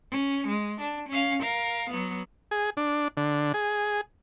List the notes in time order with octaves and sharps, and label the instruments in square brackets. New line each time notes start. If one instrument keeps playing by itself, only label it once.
[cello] C#4
G#3
D4
C#4 F5
A#4 F5
F#3 B3
[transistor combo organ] G#4
D4
D3
G#4